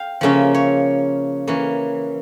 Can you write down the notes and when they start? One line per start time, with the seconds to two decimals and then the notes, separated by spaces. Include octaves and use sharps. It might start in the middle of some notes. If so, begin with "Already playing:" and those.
Already playing: F5 G5
0.21 C#3 F3 A#3 C#4 E5
0.54 C#5
1.47 E3 A#3 C#4